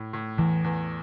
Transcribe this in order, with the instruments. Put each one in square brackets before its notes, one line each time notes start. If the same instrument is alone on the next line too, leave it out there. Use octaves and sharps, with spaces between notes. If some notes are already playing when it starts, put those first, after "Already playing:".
Already playing: [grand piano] A2
A2
[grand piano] E2 [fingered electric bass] E3
[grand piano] E2